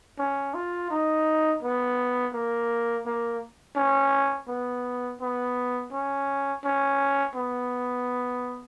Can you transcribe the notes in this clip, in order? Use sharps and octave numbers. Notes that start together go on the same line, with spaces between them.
C#4
F4
D#4
B3
A#3
A#3
C#4
B3
B3
C#4
C#4
B3